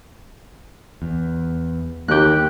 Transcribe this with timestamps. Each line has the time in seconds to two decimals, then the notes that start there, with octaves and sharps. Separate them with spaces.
1.02 E2
2.08 D#2 A#3 G4 F#6